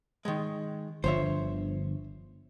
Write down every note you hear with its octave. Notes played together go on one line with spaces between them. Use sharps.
D#3 G#3
G1 D3 F3 C5 C#5 E5